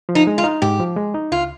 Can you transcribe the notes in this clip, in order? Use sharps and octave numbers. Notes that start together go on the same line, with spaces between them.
F3
D#4
G#3
F4
D#4
G#2 G4
F3
G#3
D#4
C#2 F4